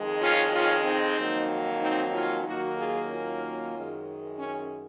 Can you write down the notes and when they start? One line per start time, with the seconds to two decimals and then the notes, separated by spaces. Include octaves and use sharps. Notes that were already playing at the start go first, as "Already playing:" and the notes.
Already playing: F2 D#3 G#3
0.21 C#4 F4
0.52 C#4 F4
0.84 C4 D#4
1.17 F2 D#3 F#3 A#3
1.81 C4 D#4
2.13 C#4 F4
2.45 D#2 D#3 F#3 A#3 D#4 F#4
2.77 F4 G#4
3.09 C#4 F4
3.74 F#2 D#3 G#3
4.38 C#4